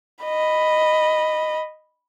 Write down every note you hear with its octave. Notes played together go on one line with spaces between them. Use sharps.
D#5 B5